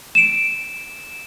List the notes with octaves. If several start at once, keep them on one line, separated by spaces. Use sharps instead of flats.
D7 E7